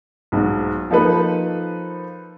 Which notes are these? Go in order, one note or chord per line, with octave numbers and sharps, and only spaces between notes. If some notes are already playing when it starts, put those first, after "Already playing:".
B1 G#2
F3 A#3 D#4 A4 B4